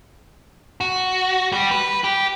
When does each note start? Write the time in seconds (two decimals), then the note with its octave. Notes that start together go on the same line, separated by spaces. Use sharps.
0.81 F#4
1.52 G3
1.71 B4
2.04 G4